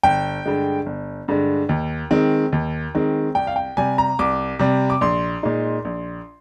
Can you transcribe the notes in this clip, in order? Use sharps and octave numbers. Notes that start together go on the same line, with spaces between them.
G1 G5
G2 D3 G#3
G1
G2 D3 G#3
D#2
D#3 G#3 C4
D#2
D#3 G#3 C4
C2 G5
F5
G5
C3 G3 G#5
A#5
C2 D6
C3 G3
D6
A#1 C6
A#2 G#3 D#4
A#1